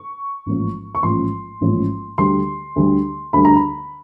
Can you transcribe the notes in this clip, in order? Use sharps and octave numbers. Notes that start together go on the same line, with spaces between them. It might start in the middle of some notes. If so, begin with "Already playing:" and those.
Already playing: C#6
A1 G#2 F3 A#3 C#4
C#6
A1 G#2 F3 A#3 C#4 C6
A1 G#2 F3 A#3 C#4
D2 D3 G3 C6
D2 D3 G3
D2 D3 G3 B5
A#5
B5